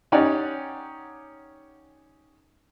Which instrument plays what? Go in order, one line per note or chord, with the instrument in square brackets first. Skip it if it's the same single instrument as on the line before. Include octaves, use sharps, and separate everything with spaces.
[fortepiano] C#4 D#4 G4 D5 F#5 G#5